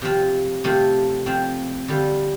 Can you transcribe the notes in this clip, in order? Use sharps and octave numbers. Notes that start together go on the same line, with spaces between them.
C3 F3 C4 F4
C3 A3 C4 F4
F3 C4 F4
D3 G3 F4